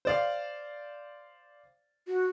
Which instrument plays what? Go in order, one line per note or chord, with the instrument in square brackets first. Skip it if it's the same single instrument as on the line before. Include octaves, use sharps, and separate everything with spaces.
[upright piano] C5 D5 F5
[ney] F#4